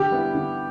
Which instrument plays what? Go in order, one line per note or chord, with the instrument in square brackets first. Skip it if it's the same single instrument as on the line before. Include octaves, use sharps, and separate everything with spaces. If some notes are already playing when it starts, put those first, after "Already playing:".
Already playing: [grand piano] D3 [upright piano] G4
[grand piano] G3 B3 E4
D3